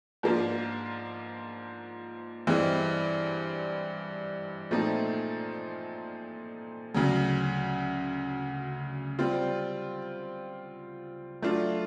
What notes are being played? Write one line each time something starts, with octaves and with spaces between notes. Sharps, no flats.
G#2 F3 A#3 D4 F4
G2 E3 G#3 C4
A#2 F3 A3 C4 D#4
D2 C#3 F#3
G3 C4 F4
F#3 A3 D4 F4